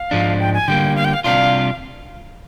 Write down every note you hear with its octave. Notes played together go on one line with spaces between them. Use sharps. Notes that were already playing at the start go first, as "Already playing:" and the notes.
Already playing: F5
G#2 F3 G#3 D4
G5
G#5
D3 G3 A#3 G5
F5
G5
F5
C2 C3 G3 D4 F4 F5